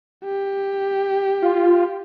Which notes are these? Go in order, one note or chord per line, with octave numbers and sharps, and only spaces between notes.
G4
F4